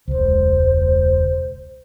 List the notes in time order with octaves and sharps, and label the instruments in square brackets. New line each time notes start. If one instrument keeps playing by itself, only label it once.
[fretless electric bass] E1 C#2 [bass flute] C5